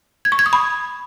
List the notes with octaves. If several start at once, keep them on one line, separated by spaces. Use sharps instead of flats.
G#6
C#6
G#6
D#6
B5